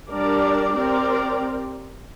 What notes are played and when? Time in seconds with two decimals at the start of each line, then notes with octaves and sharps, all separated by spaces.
0.10 G3 D4 A#4 D5
0.74 C4 G4 A#4 D5